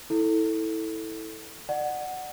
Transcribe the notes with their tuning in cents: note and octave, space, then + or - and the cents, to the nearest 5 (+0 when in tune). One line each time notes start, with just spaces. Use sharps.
E4 -20 A4 +0
D5 +30 F#5 +0